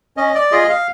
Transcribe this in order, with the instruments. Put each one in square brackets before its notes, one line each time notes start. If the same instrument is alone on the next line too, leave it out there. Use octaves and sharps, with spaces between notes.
[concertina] C#4 D#5
D5
F4 G#4 D#5
F5